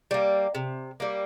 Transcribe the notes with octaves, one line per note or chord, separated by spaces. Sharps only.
G3 A#3
C3
G3 A#3